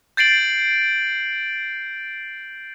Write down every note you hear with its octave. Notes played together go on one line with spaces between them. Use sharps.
G6 A6 C7 D7 F#7